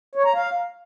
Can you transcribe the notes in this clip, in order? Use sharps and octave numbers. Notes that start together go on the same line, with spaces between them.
C#5
A#5
F5